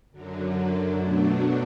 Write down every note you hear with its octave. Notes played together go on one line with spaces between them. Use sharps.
F#2 D3 F#3
B2 F#3 A3 D4